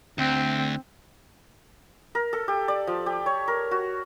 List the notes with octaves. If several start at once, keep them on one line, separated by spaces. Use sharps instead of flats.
D2 C4
A#4
A4
G4
D5
F3
G4
C#5
A#4
F#4